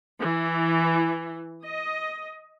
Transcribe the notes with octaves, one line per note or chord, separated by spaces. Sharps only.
E3
D#5